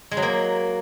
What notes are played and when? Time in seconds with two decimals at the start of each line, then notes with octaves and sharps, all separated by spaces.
0.11 G#3
0.17 F#3
0.23 A#3